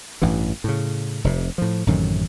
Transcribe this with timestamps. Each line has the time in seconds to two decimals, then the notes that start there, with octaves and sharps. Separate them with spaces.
0.22 A1 G2 E3
0.64 A2 C#3
1.24 F1 C3
1.58 A2 F3
1.87 A1 F#2 C3 D#3